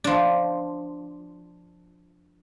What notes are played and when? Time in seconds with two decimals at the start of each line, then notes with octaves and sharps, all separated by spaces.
0.04 F3 D4